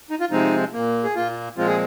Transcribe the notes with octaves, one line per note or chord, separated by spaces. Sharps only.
D#4
F4
C3 F3 G#3 C4 D#4
A#2 A#3
G#4
A#2 A#3 F4
A#2 F3 G#3 C4 F4
G#4